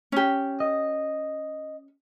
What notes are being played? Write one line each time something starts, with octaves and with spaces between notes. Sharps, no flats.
C#4 G4
D#5